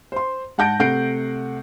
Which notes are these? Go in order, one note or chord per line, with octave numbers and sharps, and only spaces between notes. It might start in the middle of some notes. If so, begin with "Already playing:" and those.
C5 C6
G#2 F#5 A5 G6 A#6 D7
C3 A3 F#5 G6 C7 D7